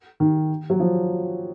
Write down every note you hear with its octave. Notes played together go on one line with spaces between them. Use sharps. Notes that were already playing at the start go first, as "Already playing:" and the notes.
D#3
F#3
F3